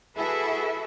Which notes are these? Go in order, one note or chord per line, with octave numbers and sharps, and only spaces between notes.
E4 F#4 G#4 A4 B4 E5